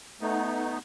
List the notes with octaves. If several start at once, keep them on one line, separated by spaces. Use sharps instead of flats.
A3 B3 D#4